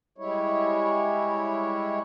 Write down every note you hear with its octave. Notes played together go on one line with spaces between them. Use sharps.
G3 G#3 E4 C#5